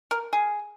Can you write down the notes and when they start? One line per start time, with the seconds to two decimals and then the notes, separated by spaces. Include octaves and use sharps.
0.11 A#4
0.33 G#4